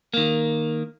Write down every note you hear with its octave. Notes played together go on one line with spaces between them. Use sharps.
D#3 A#3